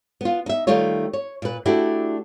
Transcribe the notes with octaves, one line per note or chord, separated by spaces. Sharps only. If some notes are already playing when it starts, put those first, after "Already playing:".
B3 F4
D#4 E5
D#3 G3 A3 D#4 F4 C#5
C#5
A#2 B4
A3 D4 E4 F#4 G4